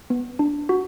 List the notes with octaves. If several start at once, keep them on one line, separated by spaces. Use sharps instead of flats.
B3
D4
F#4